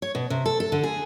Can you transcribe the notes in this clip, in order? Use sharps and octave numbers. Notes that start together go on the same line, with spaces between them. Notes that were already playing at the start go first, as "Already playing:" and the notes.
C#5
B2
C3
A4
A4
D3
G#4